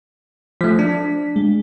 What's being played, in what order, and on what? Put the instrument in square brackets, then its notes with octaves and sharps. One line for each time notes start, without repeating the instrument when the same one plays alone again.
[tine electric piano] F3 A3 [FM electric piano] B6
[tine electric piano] D4
[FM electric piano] G#3